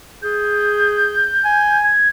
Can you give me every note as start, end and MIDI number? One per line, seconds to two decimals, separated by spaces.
0.23 1.38 68
0.23 1.78 91
1.45 1.90 80
1.84 2.08 92